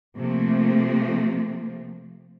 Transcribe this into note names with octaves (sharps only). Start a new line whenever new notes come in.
C3 F3 A3 A#3